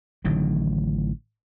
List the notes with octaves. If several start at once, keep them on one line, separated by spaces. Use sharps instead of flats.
A1 D3 D#3 F#3